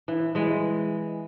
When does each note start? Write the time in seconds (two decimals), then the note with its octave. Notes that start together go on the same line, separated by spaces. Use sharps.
0.08 E3
0.35 E3 G#3